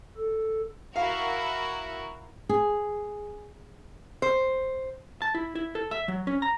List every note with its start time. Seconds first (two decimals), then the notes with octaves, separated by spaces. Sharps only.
0.17 A4
0.96 E4 F#4 A#4 F5
2.49 G#4
4.22 C5
5.22 A5
5.35 E4
5.55 E4
5.75 A4
5.91 E5
6.08 F#3
6.27 C#4
6.42 A#5